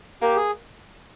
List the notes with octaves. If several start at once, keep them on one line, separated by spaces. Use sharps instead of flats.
A#3 G4
G#4